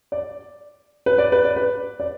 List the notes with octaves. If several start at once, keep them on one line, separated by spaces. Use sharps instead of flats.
D5
B4
D5
B4
D5
B4
D5